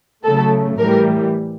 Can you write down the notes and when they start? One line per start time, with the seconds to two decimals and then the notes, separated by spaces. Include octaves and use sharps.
0.24 C#3 F#3 A3 A4
0.77 A2 E3 G3 A#4